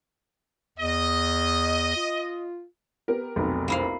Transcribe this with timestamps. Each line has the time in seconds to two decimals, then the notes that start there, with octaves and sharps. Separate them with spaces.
0.78 E2 D#5
1.96 F4
3.08 B3 G4 A#4
3.36 F1 B1
3.68 A#3 E4 F5